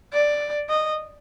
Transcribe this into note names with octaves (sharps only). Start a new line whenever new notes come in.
D5
D#5